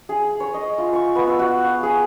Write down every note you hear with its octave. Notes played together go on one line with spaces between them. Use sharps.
G#4
G#4
C#5
D#5
F4
C#6
B3
E6
F#4
F5
G#4